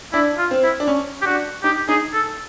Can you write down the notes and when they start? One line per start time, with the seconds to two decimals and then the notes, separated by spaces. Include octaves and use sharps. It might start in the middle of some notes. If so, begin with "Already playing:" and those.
0.13 D4 E4
0.38 F4
0.51 C4
0.63 E4
0.80 D4
0.88 C#4
1.22 G4
1.26 D4 F#4
1.63 D#4 G4
1.89 D#4 G#4
2.14 A4